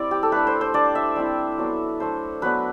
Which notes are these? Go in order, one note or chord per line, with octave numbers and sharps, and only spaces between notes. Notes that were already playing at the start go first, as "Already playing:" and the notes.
Already playing: G3 C4 E4 D5
G4
A4
A3 D4 B4
C5
C5
G3 D4 D5
E5
G3 C4 E4
F#3 B3 D4
A3 D4 C5
F#3 B3 D4 B4